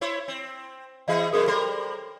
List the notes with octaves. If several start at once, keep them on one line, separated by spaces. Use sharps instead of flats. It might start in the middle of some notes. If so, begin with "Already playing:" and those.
E4 C5 C#5
C4
E3 B3 G#4 D#5 E5 B5
F#2 B2 G#4 A#4 C5 D#6
G3 A4 A#4 C5 C6